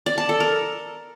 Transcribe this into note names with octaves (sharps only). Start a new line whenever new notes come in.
D5
A5
A4
A#4